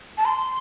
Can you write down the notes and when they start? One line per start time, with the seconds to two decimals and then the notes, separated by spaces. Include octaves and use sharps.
0.18 A5
0.25 C6